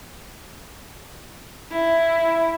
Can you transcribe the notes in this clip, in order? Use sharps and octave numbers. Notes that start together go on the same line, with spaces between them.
E4